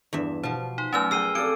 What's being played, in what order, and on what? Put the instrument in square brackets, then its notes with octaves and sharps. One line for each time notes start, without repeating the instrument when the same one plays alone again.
[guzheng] E2 G2 E5
[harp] B2 [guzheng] F3 A5 [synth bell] C5
[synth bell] D#4 [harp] C6
[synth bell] F#3 A3 C#4 [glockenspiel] G#5 E6 F6
[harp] G#4 G5 [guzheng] A#4 [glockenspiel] E6 C7 D#7
[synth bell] C4 F6 [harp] G4 A4 D5 [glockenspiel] D7